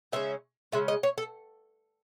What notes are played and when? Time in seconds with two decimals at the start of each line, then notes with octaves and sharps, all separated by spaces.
0.12 C#3 G#3 C#4 E5
0.72 C#3 G#3 C#4 E5
0.88 D#5
1.03 C#5
1.18 A4